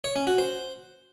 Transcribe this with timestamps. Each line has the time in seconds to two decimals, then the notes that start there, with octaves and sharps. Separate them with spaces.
0.04 C#5
0.16 C#4
0.27 F#4
0.38 C5